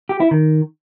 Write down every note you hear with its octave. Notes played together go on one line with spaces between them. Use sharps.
G4
E4
D#3